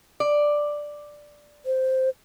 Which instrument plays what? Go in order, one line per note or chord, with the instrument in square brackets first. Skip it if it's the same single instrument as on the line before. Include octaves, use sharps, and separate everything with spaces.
[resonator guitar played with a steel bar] D5
[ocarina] C5